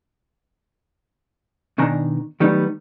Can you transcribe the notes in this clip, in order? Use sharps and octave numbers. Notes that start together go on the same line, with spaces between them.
B2 D#3 D4 G#5 A#5
D#3 F#3 G3 A3 B3 D#4